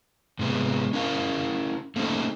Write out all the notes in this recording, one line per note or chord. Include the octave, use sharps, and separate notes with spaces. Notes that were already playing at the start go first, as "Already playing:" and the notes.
G#2 C3 G#3 B3
C#4 E4 A#4 F5
A3 A#3 C4 C#4 D#4 A4